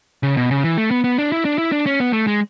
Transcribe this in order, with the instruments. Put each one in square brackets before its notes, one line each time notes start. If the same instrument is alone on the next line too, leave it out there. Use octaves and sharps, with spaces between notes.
[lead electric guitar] C#3
B2
C#3
E3
A3
B3
B3
D4
E4
D4
E4
D4
C#4
B3
A3
G#3